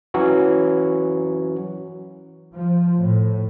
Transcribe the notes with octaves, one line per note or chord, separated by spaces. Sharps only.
E3 F#3 C#4 F#4
F3
A2